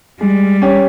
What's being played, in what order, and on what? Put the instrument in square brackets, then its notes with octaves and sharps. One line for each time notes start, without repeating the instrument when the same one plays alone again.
[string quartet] G3 [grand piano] G#3
[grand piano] C#4 G4 C#5